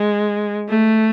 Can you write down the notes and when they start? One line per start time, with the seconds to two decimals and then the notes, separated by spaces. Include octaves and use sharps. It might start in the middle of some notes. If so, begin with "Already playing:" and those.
Already playing: G#3
0.69 A3